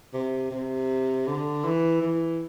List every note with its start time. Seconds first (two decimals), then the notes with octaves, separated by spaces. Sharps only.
0.14 C3
0.51 C3
1.27 D3
1.64 E3
2.02 E3